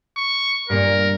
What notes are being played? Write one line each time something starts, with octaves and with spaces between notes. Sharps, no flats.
C#6
G2 A#2 A#3 A#4